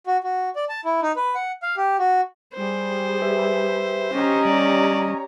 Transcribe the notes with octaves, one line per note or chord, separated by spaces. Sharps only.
F#4
F#4
D5
A5
E4
D#4
B4
F#5
F5
G4
F#4
G3 G#4 C5
G4 B4 E5
C#4 G4 C#5 D#5 A#5
G3 D5